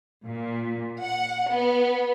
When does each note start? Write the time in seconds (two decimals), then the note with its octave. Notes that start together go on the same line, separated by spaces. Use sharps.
0.24 A#2
1.01 F#5
1.49 B3